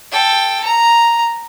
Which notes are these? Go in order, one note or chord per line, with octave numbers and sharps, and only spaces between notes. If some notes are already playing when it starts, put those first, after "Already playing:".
A4 G5
A#5